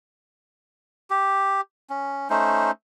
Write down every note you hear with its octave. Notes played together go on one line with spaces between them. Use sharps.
G4
C#4
A3 C#4 D#4 C5